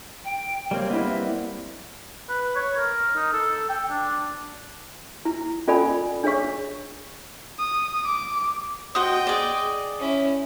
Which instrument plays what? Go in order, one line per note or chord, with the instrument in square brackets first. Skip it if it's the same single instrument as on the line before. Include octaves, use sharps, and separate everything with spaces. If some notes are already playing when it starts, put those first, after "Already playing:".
[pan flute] G5
[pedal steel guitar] G3 A#3 C4 [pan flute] C#5
[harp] B3 E4 [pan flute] D#5
[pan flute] E5
[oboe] B4
C#5
A#4
D#4
A4
G5
D4
[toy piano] E4
C#4 F4 A4 D5 G#5 B5
D4 G#4 C#5 F5 C#6
[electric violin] D#6
D6
[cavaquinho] F#4 C5 D#6 [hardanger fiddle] D#5 G5
[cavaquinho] G#4 D5
[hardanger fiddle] C#4 E4